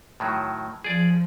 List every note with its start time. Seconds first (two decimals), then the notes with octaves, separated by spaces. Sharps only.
0.20 A2 D#3 F#3
0.84 F3 G#4 D5